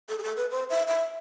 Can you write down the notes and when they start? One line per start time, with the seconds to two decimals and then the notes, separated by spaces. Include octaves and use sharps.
0.09 A4
0.18 G#4
0.23 A4
0.37 B4
0.51 C5
0.70 E5
0.87 E5